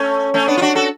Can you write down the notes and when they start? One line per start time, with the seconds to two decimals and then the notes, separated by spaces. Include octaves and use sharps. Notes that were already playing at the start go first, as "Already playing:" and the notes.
Already playing: A3 C#4
0.34 A3 C#4
0.48 B3 D4
0.57 F4
0.61 D4 F#4
0.75 F#4 A4